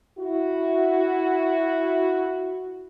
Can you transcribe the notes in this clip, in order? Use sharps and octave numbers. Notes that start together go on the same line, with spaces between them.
E4 F#4